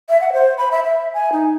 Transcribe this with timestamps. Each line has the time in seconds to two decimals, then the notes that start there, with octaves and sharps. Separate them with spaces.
0.09 E5
0.21 F#5
0.33 C5
0.58 B5
0.72 E5
0.84 E5
1.14 G#5
1.32 D#4